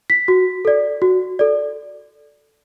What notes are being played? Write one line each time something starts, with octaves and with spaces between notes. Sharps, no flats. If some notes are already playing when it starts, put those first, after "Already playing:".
B6
F#4
A4 D5
F#4
A4 D5